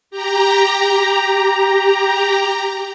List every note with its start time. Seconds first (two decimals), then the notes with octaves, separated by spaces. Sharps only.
0.11 G4 A#5